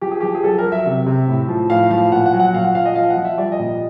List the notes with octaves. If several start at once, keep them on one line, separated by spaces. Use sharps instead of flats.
F3 G4
G#4
F3 G4
G#4
F#3 A4
A#4
F#3
E5
C3
C3
A2
F3
A2 F5
F3 F5
A#2 F#5
F#5
F#3
F#5
A#2 F5
F#5
F3 F5
D#5
F3 F5
F#5
F3
E5
G3 D5
D#5
A#2
D#5